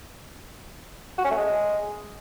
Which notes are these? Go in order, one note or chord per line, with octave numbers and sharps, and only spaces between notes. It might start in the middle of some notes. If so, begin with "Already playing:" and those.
F#4
C#4
A3
G#3